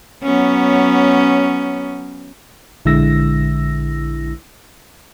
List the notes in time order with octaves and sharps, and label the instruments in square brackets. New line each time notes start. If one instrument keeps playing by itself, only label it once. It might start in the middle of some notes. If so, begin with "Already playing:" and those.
[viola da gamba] F#3 B3 C#4
[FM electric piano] A#1 D3 G#3 E4 E6 A#6